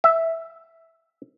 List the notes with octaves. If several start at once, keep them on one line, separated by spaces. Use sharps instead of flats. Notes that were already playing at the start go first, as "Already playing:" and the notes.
E5